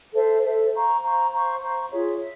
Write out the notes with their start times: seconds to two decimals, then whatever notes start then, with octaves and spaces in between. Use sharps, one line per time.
0.14 A4 C5 E5
0.44 A4 C5 E5
0.73 C5 F5 A#5 C#6
1.03 C5 F5 A#5 C#6
1.32 C5 F5 A#5 C#6
1.62 C5 F5 A#5 C#6
1.90 F4 G#4 C#5 E5
2.20 E5